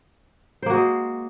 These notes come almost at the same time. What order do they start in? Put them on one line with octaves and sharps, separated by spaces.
C5 A#3 F#4 G#3